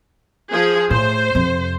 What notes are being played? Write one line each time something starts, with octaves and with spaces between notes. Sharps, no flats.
F3 G#4
A2 C5
F2 C3